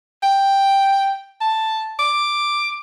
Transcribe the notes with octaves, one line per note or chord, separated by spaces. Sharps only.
G5
A5
D6